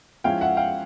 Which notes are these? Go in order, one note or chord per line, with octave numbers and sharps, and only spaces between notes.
F3 G#3 C#4 E4 F5 G5
E5 F#5
F5 G5